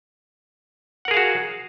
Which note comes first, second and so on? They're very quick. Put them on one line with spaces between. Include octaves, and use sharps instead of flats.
F#5 A#4 G#4 F5 F#4